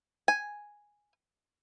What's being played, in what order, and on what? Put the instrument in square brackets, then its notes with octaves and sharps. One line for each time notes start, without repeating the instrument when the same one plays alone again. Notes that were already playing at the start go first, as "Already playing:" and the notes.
[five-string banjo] G#5